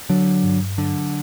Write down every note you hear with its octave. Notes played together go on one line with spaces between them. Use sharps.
D3 F#3
G2
D3 F#3